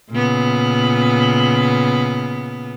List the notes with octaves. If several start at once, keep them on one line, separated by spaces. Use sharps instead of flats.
A#2 C#3 B3